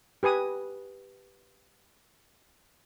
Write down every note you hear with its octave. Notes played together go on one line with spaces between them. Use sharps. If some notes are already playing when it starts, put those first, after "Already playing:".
G4 B4 G#5 D#6